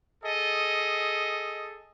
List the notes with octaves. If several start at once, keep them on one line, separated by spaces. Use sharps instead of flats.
G#4 A4 D#5